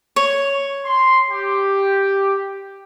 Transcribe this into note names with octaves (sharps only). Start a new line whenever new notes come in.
C#5
C6
G4